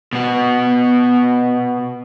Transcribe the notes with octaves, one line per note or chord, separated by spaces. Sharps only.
B2 B3